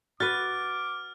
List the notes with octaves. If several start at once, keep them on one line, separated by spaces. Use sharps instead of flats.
F#4 B4 D6 F6 A6